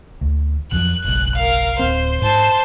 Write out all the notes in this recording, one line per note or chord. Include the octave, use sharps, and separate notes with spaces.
D2
F2 F3 F#3 F#6
F#1 B1 F#6
A#4 F5
D1 C4 C5
G#2 C5 A5